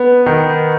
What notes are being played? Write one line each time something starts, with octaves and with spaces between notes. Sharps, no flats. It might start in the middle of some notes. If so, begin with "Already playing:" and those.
Already playing: B3
D#3